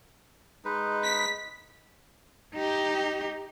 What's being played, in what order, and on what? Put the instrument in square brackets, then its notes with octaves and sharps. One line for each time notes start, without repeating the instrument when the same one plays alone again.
[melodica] G#3 D#4 B4
[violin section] B6
[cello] D#4 G4